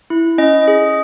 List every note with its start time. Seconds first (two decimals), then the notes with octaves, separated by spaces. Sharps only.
0.10 E4
0.38 C#4 D#5
0.68 G#4